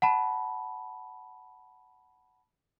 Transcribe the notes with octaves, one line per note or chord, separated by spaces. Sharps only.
F#5 A5 B5